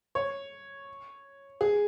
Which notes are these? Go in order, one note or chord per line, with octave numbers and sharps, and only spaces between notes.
C#5
G#4